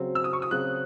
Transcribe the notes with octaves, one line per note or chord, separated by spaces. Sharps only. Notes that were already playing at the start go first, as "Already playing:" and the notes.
Already playing: C#3 F#3 C4
E6
D#6
C#6
D#6
C#3 F#3 C4 F#6